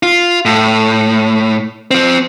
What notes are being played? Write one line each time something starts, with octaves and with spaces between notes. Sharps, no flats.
F4
A2
F3 C4